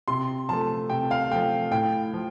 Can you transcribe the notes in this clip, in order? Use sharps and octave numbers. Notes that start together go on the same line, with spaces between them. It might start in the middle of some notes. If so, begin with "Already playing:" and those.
C3 C6
F3 A3 A5
C3 G5
F5
F3 A3 G5
A2 G5
F3